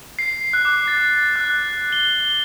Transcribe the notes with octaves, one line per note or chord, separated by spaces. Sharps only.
C7
F#6
D6
A6
F#6
G7